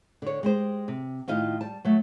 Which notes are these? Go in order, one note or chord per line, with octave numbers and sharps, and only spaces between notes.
D3 C#5
G#3 G4 C5
C3
A2 D#3 F4 D#5 F5
G3 A5
F#3 A3